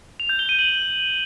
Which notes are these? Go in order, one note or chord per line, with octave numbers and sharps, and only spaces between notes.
F7
G6
G7
D#7
F#7